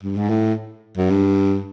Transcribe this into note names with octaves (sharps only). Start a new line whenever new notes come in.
G2
G#2
A2
F#2
G2